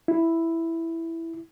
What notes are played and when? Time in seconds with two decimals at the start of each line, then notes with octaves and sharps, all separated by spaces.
0.08 E4